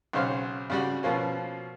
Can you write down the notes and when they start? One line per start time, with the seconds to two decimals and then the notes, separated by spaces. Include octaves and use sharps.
0.13 B1 C#3 C5 C#5 F5
0.70 C#3 G3 F#4
1.03 B2 F3 A#3 C#4